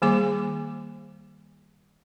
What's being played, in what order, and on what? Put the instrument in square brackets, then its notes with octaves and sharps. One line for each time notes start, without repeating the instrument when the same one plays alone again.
[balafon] D#3 G3 A#3 G#4 D6